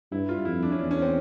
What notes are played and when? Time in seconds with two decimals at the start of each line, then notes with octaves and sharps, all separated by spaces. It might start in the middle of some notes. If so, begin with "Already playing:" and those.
0.12 G2 E4
0.29 F4
0.45 F2 E4
0.63 D4
0.72 C#4
0.79 E2 D4
0.91 C#4
1.02 C4